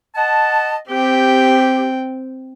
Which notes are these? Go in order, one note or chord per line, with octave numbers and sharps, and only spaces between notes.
D#5 F#5 A5
C4 G4 G5